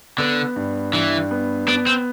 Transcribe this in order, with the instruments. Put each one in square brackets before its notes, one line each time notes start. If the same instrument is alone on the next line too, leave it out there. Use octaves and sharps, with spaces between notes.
[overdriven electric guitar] D3 [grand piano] B3
[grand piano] G2
[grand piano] G2 [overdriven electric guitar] E3
[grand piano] B3
[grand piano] B3 [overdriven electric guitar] D4
[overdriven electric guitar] C4